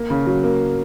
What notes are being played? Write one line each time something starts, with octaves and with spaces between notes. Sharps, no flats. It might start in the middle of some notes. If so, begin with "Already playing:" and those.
Already playing: A#3
C#3
F#3
A#3